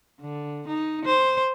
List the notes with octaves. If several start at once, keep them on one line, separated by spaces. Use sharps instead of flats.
D3
D#4
C5